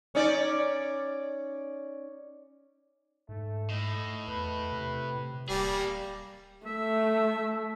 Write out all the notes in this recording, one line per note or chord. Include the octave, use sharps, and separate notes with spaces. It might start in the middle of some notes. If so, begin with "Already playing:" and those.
C#4 D#4 D5
G#2 A3
A2 D#5
E2 B4
C3
D1 G3 A#3 G#4
A3 E5